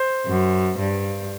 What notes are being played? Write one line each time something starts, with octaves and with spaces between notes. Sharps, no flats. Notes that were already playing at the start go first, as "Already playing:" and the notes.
Already playing: C5
F#2
G2